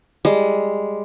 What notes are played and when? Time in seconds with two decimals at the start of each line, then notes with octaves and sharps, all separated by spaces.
0.25 G3 G#3